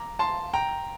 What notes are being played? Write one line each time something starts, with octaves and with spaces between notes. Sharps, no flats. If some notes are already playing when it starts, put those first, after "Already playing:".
Already playing: A#5 D6
A5 C6
G5 A#5